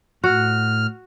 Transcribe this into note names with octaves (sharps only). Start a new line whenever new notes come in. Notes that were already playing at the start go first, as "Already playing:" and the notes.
A2 F#4 F6